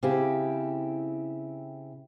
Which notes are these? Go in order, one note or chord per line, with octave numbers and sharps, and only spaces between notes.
C#3 C4 E4 G4